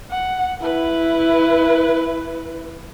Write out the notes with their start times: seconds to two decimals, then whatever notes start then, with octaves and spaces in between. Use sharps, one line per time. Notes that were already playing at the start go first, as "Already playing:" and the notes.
0.10 F#5
0.61 E4 B4